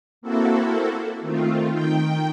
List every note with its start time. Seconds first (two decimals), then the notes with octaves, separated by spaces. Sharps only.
0.22 A#3 C4 E4 F#4 A4
1.21 D#3 A3 C4 F4
1.70 D#3 G5